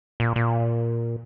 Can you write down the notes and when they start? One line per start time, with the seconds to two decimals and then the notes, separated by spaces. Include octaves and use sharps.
0.20 A#2
0.36 A#2